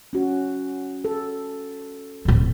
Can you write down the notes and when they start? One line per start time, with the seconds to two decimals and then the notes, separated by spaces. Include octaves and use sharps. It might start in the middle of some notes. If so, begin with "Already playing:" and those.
0.13 C#4 F#4
1.05 A4
2.25 D1 A#1